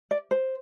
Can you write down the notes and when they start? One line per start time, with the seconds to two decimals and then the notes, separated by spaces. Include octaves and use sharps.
0.11 D5
0.31 C5